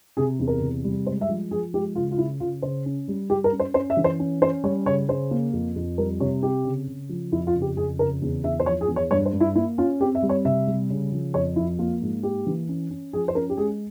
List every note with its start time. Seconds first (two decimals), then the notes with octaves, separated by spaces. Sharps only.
0.17 C3 G#4
0.40 E2
0.48 A#4
0.61 C3
0.84 G3
1.07 G#3 C5
1.21 E5
1.29 F3
1.51 F3 G#4
1.74 G#3 G4
1.96 C#3 F4
2.11 F4
2.18 C#3 E4
2.40 C#3 F4
2.62 C#3 C5
2.86 C#4
3.08 G3
3.30 G3 G4
3.44 A#4
3.52 C#4
3.60 C5
3.74 C#4 C5
3.90 E5
3.97 E3
4.04 C5
4.19 C#4
4.42 C#4 C5
4.64 G3 C#5
4.86 C#3 C#5
5.09 C#3 C5
5.31 A#3
5.53 F2
5.76 F2
5.98 G3 A#4
6.20 C3 C#5
6.43 C4 G4
6.65 C#3
6.87 C#3
7.09 F3
7.32 F2 E4
7.47 F4
7.55 C#3
7.62 G4
7.77 F2 G#4
7.99 C#3 A#4
8.22 E2
8.44 E2 E5
8.60 C5
8.66 F3 C#5
8.81 G#4
8.88 E2
8.96 C#5
9.11 G2 C#5
9.26 C5
9.34 G2
9.40 E4
9.55 A#3 E4
9.78 C#4 F4
10.00 C4 G4
10.15 E5
10.22 G3
10.29 C#5
10.45 C3 E5
10.67 G3
10.90 C#3
11.12 F3
11.34 F2 C#5
11.56 F3 E4
11.79 A#3 F4
12.02 G#2
12.23 A#3 G4
12.47 E3
12.69 C#4
12.91 C#4
13.13 F3 G#4
13.28 C5
13.35 C#4 A#4
13.50 G4
13.57 G#3 G#4